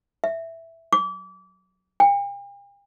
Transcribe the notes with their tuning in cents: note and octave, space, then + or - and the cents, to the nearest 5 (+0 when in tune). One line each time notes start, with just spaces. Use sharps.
E5 +0
D6 -30
G5 +45